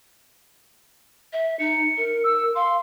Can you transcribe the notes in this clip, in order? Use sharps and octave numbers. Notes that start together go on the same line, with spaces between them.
E5
D#4 C#7
A#4
E6
F5 C6